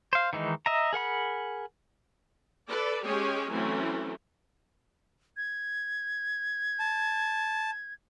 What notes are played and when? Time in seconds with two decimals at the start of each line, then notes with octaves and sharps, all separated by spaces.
0.13 C5 F5
0.33 D#3 E3 G#3 D#4
0.66 D#5 E5 A#5
0.93 G#4 A#4 F#5 B5
2.67 A4 B4 D5
3.04 G#3 C#4 G4 G#4 C#5 G#5
3.50 E3 F#3 A3 C4 C#4
5.37 G#6
6.79 A5